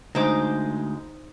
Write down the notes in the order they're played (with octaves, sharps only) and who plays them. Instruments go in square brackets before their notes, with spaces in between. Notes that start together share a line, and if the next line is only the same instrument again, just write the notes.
[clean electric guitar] D2 G#3 [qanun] D#4 C5 D6